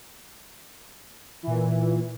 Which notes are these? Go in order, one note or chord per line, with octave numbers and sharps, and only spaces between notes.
A#2 E3